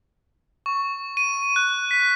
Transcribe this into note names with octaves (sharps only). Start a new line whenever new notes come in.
C#6
D#7
F#6
B6